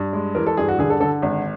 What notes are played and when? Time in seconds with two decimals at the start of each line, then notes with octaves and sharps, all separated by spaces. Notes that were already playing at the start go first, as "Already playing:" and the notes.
Already playing: G2
0.13 G#3
0.35 E3 A#4
0.46 A4
0.57 G2 G#4
0.69 F#4
0.79 D3 G#4
0.90 A4
1.01 D3 A4
1.22 G#1